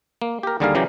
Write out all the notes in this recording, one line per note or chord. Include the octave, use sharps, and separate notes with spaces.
A#3
G4 A#4
D#2 D3 G3 G#4 A#4 F5
C#3 E3 F#3 G4 A#5